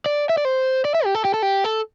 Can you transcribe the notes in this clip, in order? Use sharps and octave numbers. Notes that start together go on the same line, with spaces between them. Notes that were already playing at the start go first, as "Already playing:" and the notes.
D5
E5
D5
C5
D5
E5
G4
A4
G4
A4
G4
A4